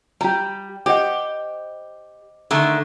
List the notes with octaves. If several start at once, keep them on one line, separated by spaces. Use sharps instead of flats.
G3 G4 A#5
G4 C5 D#5 F#5
D3 D#3 A3